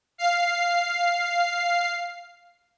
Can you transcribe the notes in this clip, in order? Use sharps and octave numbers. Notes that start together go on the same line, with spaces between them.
F5 C7